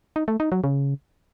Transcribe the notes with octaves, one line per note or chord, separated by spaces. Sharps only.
D#4
A3
D#4
F#3
C#3